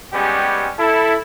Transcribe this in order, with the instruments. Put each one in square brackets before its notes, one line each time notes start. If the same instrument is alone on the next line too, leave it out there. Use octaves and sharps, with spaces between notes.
[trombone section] G3 G#3 B3 C#4 G4 G#4
E4 A4